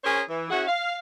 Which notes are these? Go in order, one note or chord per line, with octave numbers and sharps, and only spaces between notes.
C#4 G#4 A#4 C5 C#5
E3
C#4 E4 F#4 G#4 F#5
F5